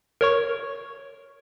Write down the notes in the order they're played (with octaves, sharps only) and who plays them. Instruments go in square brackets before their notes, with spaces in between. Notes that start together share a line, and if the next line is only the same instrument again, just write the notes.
[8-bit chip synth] A#4 C#5 C#6